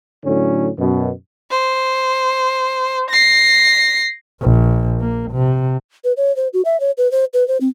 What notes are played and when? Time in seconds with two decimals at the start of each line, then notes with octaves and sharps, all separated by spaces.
0.24 A2 D3 F#3 C#4
0.78 F#2 B2
1.51 C5
3.10 A#6 C7
4.41 A#1
5.01 A#3
5.31 C3
6.04 B4
6.17 C#5
6.36 C5
6.53 F#4
6.65 E5
6.80 C#5
6.97 B4
7.11 C5
7.33 B4
7.48 C5
7.61 C4